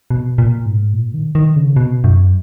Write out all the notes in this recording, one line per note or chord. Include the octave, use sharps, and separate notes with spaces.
B2
A#2
G#2
A#2
D#3
D#3
C#3
B2
F#2